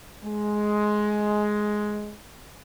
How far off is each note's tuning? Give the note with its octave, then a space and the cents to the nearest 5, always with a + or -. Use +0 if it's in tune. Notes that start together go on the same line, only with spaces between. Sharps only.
G#3 +10